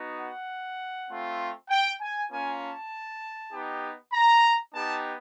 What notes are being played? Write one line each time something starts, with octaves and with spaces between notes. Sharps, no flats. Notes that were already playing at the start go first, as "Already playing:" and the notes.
Already playing: B3 D#4 F#4
F#5
A3 C4 F4
G5
G#5
A#3 C#4 F4 G#5
A5
B3 D#4 G4
A#5
B3 D#4 G4 A5